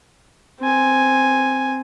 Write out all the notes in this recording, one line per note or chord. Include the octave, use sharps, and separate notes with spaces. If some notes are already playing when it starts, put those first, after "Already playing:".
C4 G#5